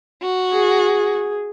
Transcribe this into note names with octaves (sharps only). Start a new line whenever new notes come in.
F#4
G#4